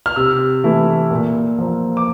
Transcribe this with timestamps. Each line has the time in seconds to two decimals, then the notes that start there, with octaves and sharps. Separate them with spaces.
0.06 F6
0.16 C3 E6
0.64 E3 A3 E4
1.11 A#2
1.58 F3 A#3
1.97 D6